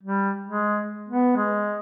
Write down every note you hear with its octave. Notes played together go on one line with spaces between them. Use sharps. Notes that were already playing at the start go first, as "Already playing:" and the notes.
G3
G#3
B3
G#3